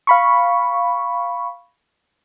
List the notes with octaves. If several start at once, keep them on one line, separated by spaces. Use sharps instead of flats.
F5 B5 C#6